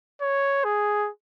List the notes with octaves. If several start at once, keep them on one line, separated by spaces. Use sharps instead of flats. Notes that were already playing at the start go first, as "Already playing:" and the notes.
C#5
G#4